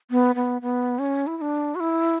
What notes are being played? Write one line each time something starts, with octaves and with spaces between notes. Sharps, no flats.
B3
B3
B3
C#4
E4
E4
D4
F#4
E4